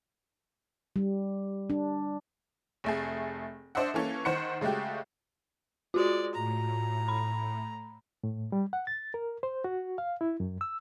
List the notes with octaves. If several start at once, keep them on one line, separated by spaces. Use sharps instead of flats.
G3
D4
F1 A3 G#4
D4 C5 D#5 E5 F#5
E3 A#3 C#4 A4
D#3 C5 F#5 C#7
C#3 G#3 A3 F#4 G4
G#3 F4 F#4 D5
A2 A#5
B5
A2
G3
F#5
A6
A#4
C5
F#4
F5
E4
F#2
E6